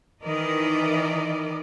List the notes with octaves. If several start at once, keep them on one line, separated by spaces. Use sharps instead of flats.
D#3 E3 E4 A#4 D5 D#5